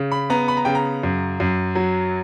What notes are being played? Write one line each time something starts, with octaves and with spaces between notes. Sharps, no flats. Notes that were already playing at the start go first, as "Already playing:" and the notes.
Already playing: C#3
B5
B3 A#5
B5
A#5
C#3 G5
A#5
F#2
F#2
F#3